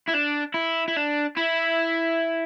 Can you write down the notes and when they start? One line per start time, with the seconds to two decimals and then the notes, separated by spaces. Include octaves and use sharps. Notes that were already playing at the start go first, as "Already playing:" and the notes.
0.08 E4
0.13 D4
0.54 E4
0.88 E4
0.97 D4
1.37 E4